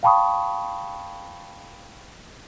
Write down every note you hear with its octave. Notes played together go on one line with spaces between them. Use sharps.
F5 G5 A5 B5 C#6 D#6